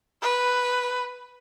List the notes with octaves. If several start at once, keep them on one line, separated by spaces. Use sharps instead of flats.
B4